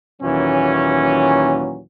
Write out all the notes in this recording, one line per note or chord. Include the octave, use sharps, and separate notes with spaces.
D#2 A#2 E3 F#3 C#4